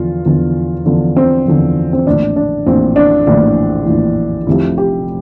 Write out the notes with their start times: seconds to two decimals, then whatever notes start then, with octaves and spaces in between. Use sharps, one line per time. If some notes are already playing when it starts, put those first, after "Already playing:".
Already playing: E2 D3 F3 F4
0.25 E2 D3 F3
0.86 E2 D3 F3
1.17 C4
1.46 E2 D3 F3
1.93 C4
2.06 A#1 A2 E3 D4
2.36 D4
2.66 A#1 A2 E3 C4
2.96 D4
3.27 A#1 A2 E3 D4
3.86 A#1 A2 E3
4.47 F1 F2 C3 F3 E4
4.78 G4